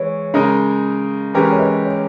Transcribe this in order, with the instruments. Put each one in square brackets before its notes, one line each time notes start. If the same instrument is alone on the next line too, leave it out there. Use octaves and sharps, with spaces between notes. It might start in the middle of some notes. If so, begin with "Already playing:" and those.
Already playing: [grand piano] E3 G#3 [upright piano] C#5
[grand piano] C#3 G#3 D#4 A#4
E3 G#3 C#4 G4 A#4
[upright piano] C#5
B4 D#5
C#5